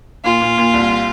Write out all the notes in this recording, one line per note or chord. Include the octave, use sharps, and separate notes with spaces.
A#2 F4
A#2
A#2
C2